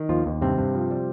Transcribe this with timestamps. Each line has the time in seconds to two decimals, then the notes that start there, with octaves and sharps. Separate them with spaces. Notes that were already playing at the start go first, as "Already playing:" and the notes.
Already playing: D#3
0.09 D#2 F3 F4
0.26 D#2
0.42 G2 C3 C4
0.58 G2
0.75 F3
0.91 G3